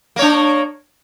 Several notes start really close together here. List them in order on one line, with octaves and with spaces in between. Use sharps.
A#3 C#5 D4